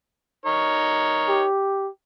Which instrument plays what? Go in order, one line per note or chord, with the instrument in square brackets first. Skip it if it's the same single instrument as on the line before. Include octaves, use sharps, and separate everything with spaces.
[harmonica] D#4 A#4 C#5
[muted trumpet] G4